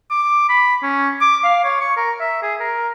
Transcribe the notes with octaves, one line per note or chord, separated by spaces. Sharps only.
D6
B5
C#4
D6
F5
C#5
C#6
A#4
E5
G#4
A#4